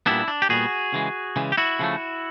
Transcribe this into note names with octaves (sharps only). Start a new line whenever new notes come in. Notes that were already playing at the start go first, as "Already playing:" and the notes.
A#2 G3 B3 D4 E4
D4
G4
A#2 G3 B3 F#4 G#4
C#3 E3 G#3
C#3 E3 G#3
G4
E4 F#4
C#3 F3 A3